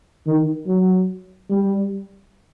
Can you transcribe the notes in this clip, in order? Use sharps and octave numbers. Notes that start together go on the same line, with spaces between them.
D#3
F#3
G3